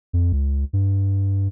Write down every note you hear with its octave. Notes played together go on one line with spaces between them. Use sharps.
F2
C#2
G2